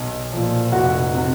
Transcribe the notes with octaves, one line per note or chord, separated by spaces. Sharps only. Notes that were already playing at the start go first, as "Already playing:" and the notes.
Already playing: B1
A#2 F3
F1 F#4
C3